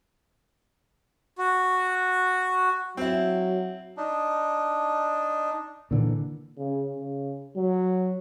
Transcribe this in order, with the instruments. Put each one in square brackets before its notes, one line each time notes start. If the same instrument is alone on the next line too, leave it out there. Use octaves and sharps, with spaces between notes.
[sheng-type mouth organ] F#4
[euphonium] F#3 [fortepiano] C4 E4
[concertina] D4 D#4
[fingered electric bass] A#2 D3 E3
[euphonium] C#3
C#3
F#3